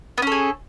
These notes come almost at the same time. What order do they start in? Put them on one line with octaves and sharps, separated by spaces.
B3 C#4 A4 G#4